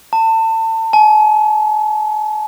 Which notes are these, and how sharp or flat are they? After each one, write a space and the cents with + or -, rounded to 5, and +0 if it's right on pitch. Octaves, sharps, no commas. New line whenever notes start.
A5 +30
G#5 +45